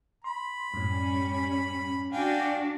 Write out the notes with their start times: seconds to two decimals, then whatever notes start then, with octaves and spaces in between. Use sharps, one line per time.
0.24 B5 C6
0.74 F#2 A2 G3 C#4
2.12 D4 F#4 F5 G5 G#5